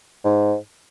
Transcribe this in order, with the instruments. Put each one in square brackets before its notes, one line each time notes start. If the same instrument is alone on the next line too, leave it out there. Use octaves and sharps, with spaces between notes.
[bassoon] G#2